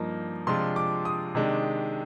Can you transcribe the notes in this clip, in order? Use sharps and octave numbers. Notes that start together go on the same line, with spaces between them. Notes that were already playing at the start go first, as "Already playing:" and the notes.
Already playing: G2 F3 A#3 D#4
C3 F3 G#3 D4 F4 C6
D6
D#6
C3 D#3 G#3 D4